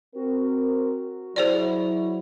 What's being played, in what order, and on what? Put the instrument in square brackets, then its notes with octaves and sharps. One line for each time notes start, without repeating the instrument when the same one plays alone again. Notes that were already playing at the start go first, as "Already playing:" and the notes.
[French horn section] C4 A#4 [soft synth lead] F#4
[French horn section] F#3 E4 [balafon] G#4 C5 D5